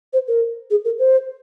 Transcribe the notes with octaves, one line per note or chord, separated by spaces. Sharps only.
C5
A#4
G#4
A#4
C5